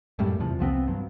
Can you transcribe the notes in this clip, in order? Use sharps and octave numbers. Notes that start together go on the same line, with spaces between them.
F#2 A2 G3
E2 C3 F3
C2 F3 B3 C4
G2 F3 F#3